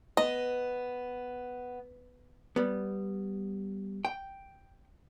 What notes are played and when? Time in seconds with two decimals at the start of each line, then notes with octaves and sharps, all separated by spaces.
0.17 B3 D#5
2.56 G3 B3
4.05 G5